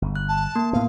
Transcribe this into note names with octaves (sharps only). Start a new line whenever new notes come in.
G1
F#6
A5
A#3
A2 B3 F5